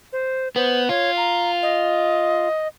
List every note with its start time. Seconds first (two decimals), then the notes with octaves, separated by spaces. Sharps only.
0.13 C5
0.56 B3 C5
0.89 F4 C#5
1.17 A#5
1.63 D#5